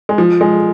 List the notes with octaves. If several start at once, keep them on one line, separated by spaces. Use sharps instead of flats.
G#3
F3
G#3